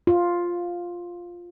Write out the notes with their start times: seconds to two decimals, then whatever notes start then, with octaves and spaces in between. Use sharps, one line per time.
0.07 F4